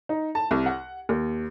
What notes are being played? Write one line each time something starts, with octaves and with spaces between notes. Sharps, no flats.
D#4
A5
C2
F#5
D#2